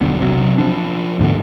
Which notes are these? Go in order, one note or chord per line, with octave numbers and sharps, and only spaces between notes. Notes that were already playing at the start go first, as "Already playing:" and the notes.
E1 B1 D3 B3
C3 F#3
F3 D4
D2 G#2 D3 B3